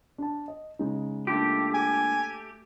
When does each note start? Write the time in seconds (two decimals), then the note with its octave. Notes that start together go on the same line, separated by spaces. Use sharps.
0.18 D4 A5
0.48 D#5
0.79 C#3 G#3 D#4
1.27 A3 A#3 D4 F4 G4
1.74 G#5